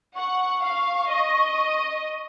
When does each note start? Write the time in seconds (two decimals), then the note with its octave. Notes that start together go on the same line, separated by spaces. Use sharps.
0.15 F#5 C#6
0.62 F5
1.10 D#5